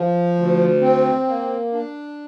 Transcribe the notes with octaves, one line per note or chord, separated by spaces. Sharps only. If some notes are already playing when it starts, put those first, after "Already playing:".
Already playing: F3
D2
C4
A#3
D4